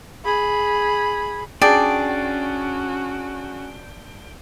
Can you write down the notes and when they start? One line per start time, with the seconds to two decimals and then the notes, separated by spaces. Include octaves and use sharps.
0.25 G#4 B5
1.62 C#4 D4 F#4 G#4 D5 G5